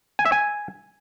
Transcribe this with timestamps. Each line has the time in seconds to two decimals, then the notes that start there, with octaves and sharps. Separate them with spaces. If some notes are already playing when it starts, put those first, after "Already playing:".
0.19 G#5
0.25 E5
0.32 G#5